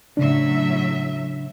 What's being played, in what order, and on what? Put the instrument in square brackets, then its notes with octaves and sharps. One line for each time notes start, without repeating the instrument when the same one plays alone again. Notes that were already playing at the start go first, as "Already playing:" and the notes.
[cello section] A2 F#3 E5 [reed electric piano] C#3 D4